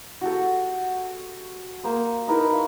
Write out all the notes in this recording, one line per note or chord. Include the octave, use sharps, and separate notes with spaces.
F#4 G4 A4
A#3 C5 D#6
D#4 E4 A#4 B4
F5 C#6